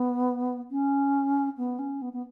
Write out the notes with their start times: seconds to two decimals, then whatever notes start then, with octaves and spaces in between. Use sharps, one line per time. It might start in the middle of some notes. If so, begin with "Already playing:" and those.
Already playing: B3
0.71 C#4
1.57 B3
1.79 C#4
2.01 B3
2.13 B3